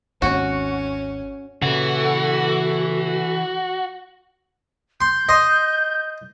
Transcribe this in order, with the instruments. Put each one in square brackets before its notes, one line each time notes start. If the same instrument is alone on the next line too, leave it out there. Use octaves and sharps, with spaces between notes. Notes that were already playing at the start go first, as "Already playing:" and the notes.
[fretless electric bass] G#1 D#2 [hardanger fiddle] C#4 [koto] F#4
[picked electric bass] A#2 C#3 [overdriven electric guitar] E3 [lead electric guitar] F#4 [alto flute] A4
[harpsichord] C6 [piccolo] G6
[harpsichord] D#5 C6